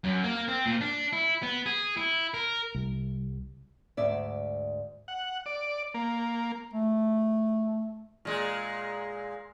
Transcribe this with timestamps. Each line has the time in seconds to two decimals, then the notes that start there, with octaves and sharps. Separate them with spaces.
0.04 F#2
0.24 A#3
0.48 C4
0.66 A#2
0.81 D4
1.13 E4
1.43 B3
1.66 G#4
1.97 E4
2.34 A#4
2.75 C2
3.97 D2 G#2 D5 E5
5.08 F#5
5.46 D5
5.94 A#3
6.74 A3
8.25 A#2 G#3